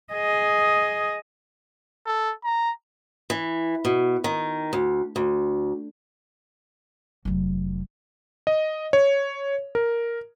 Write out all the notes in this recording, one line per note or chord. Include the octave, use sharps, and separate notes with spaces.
G#4 D#5
A4
A#5
E3
B2
D#3
D2
D2
F1 F#3
D#5
C#5
A#4